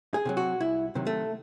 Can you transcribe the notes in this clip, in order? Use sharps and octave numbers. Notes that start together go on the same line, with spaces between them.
G#4
C3 D#3 F#3
F#4
C2 E4
C3 D#3 F#3
A3